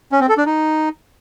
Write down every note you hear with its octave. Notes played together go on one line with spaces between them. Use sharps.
C#4
C4
A4
D4
D#4